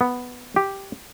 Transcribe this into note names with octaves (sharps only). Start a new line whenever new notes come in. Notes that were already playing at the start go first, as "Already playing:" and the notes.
B3
G4